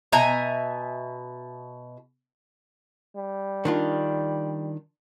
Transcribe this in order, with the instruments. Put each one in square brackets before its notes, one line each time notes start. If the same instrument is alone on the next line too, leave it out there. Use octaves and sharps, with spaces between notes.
[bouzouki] B2 E5 G#5 A#5
[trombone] G3
[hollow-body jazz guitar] D#3 D4 F4